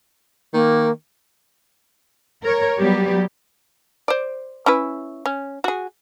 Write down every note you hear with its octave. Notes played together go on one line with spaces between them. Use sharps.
D#3 A#3
A#4 C#5
F#3 G3 B3 G4
C5 D5
C#4 E4 B4
C#4
F#4 G#4